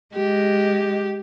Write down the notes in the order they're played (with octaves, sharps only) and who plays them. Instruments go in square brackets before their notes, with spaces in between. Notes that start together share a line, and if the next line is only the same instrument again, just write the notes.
[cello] G#3 [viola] G4